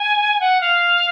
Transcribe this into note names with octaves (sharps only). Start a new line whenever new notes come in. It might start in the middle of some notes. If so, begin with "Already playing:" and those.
Already playing: G#5
F#5
F5